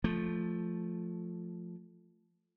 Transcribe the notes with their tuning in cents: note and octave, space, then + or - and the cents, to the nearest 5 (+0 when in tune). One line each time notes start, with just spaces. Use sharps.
F3 +0 A3 +0